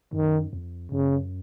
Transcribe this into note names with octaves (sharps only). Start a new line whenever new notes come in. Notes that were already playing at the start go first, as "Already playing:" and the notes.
F#2 D#3
F2
F#2 C#3